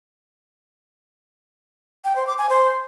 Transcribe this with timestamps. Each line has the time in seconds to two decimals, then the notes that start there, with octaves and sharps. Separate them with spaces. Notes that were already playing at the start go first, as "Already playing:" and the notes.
2.05 G5
2.16 C5
2.27 D6
2.38 G#5
2.49 C5